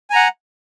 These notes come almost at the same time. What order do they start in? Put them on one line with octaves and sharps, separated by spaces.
G#5 A#5 F#5